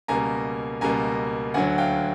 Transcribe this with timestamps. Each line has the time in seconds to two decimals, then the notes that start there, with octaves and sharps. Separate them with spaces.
0.08 C#2 B2 G3 A#3 G#5 A#5
0.81 C#2 B2 G3 A#3 G#5 A#5
1.54 D2 D3 F#3 F#5 G#5
1.78 F5 G5